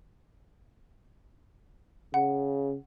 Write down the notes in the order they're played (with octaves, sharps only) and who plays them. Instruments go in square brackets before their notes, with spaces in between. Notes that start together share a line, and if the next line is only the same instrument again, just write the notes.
[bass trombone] C#3 [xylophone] F#5